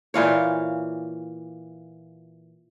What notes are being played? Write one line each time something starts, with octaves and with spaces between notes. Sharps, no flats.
A#2 E3 F4 C#5